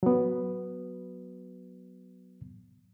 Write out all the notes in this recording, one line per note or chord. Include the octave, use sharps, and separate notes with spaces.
F#3 B3